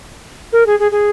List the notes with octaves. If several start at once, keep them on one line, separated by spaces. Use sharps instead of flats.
A#4
G#4
G#4
G#4